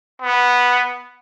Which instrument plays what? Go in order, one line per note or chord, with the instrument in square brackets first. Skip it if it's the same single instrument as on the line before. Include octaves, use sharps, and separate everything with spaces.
[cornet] B3